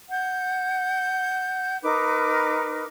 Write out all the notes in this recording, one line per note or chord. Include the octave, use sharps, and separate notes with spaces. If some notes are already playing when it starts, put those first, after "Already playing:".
F#5 G6
D#4 A#4 B4 D6